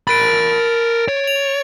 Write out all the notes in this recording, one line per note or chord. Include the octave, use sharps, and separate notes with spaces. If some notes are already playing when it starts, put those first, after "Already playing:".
A#4 B5 A6 D7
C#5
F7